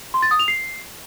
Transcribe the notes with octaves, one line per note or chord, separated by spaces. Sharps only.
C6
A6
D#6
F7
C7